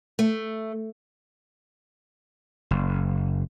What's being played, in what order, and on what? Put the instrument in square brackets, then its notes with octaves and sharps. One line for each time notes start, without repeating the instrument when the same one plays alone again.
[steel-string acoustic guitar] A3
[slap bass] F#1